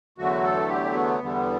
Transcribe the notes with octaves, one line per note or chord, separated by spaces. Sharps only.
E2 D3 F#3 A3 F#4
A4
G4
B3
E2 D3 G3